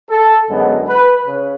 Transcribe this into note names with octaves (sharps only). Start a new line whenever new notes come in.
A4
F#2 D3 G#3 B3
B4
C#3